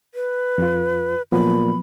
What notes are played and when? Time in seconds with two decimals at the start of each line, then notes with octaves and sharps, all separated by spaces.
0.15 B4
0.58 F2 F4
1.32 A#2 F3 F#3 B3 B5